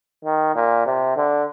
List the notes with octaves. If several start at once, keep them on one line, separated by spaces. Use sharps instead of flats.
D#3
A#2
C3
D3